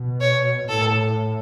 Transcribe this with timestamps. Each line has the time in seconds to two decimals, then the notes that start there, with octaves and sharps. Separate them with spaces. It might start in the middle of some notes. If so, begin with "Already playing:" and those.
Already playing: B2
0.21 C#5
0.67 A2 A4